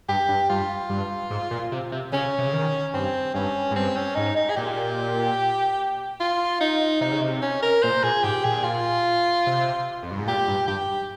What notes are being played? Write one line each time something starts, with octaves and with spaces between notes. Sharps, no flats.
G2 G4
G2
G2 F4
G2
G#2
A#2
C3
C3
C#3 C#4
C3
C#3
D#3
G2 C4
G2 C#4
G#2
G2 C4
C#4
G#2 D#4
D#4
G#4
A#2 G4
F4
D#4
C3 D#4
C#3
C3
C#4
A#4
A#2 C5
A#2 G#4
G#2 G4
A#2 G#4
F4
C3
F2
G2
G#2
A#2 G4
G2
G2 G4